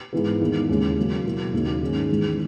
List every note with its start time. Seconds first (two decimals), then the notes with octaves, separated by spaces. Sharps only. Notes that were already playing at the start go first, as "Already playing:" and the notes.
0.13 G#2 E3 B3
0.41 E2 D#3 A#3 D#4
0.69 D#2 C#3 E3 G#3 C#4
0.97 C#3 F#3 A#3
1.25 B2 F#3 A#3 E4
1.53 D#2 C#3 F#3 A#3 D#4
1.81 G#2 D#3 G#3 C#4
2.09 E2 D#3 G#3